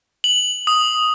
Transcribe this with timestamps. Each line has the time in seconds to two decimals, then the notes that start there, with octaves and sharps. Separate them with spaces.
0.24 F#7
0.67 D#6